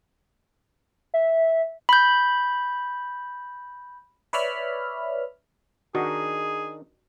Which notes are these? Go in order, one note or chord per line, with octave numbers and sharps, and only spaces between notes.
E5
B5 G6
B4 C#5 D5 E5 B5 F6
D#3 D4 D#4 F#4 G#4